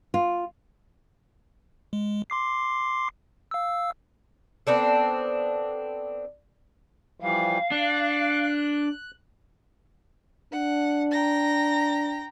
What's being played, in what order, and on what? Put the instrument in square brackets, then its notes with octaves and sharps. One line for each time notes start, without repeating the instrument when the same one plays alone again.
[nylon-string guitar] F4
[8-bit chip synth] G#3
C6 D6 C7
F5 E6
[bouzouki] B3 C4 D4 A4
[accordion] E3 F3 G3 [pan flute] F5
[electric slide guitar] D4 [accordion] F#6
[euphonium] D4 [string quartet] F#5
[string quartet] G5 A#5 A#6